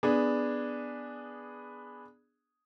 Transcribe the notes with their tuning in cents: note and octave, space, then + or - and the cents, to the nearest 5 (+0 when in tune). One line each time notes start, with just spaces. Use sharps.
B3 +0 D4 +0 G#4 +0